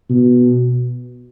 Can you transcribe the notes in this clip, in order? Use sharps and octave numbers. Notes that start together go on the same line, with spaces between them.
B2